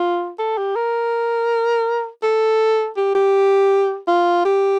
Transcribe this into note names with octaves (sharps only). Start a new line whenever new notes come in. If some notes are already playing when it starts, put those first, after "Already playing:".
Already playing: F4
A4
G4
A#4
A4
G4
G4
F4
G4